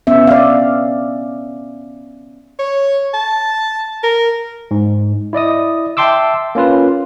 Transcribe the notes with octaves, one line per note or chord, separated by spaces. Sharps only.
B3 C#4 E5
D5 F5
C#5
A5
A#4
G#2
E4 D5 D#5 D#6
E5 G5 A5 C6 D6 E6
A#3 C#4 F4 B4